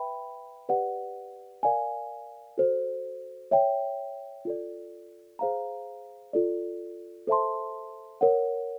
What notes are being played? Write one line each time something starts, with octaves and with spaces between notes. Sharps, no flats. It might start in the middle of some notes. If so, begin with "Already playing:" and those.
Already playing: B4 E5 G5 B5
G4 B4 D5 F#5
A#4 D5 F5 G#5
F#4 A4 C5
C#5 E5 G5
F4 A4 D5
G#4 C5 F5 A#5
F4 A4 D5
A4 C5 E5 A5 C6
A#4 C#5 F#5